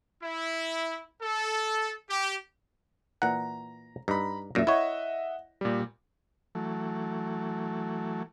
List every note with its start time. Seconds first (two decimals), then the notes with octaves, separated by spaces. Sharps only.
0.22 E4
1.21 A4
2.08 G4
3.22 A#2 E3 F#5 A#5
4.08 G2 D#4 A#5 B5
4.55 F#2 A#2 E5 A#6
4.67 E4 C#5 D#5 E5 F#5
5.61 A#2 G3
6.55 E3 F#3 A3